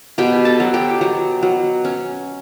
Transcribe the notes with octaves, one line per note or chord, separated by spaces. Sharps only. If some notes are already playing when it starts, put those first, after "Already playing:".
B2 G4 G5
A4 A5
F#3
G4 G5
F#3
F#3
C#4